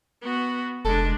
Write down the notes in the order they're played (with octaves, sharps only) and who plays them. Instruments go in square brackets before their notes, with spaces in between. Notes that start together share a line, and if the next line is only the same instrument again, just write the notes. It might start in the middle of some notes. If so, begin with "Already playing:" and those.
[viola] B3 F#4
[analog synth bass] F1 [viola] G#3 D4 [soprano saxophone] A4